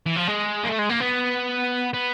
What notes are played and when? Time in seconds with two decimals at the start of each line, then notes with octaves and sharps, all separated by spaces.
0.06 E3
0.16 F3
0.27 G#3
0.64 A#3
0.68 A3
0.78 G#3
0.89 A#3
1.00 B3
1.94 B3